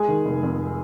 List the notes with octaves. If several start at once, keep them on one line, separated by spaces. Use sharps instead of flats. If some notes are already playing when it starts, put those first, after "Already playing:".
Already playing: G#3 G#4
D#3
F1
F2